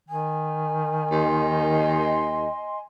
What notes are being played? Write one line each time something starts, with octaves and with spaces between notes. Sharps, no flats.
D#3 G#5
D#2 D#5 C6